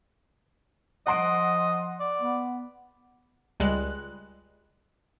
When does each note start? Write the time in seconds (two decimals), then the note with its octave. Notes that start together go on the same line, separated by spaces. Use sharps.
1.07 F3 D#5 F#5 C6 D7
2.00 D5
2.21 B3
3.60 C#2 G3 G#3 F#6